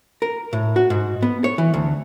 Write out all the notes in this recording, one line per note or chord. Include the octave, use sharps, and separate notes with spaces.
A#4
A2
F#4
G#2
B3
C#5
E3
D2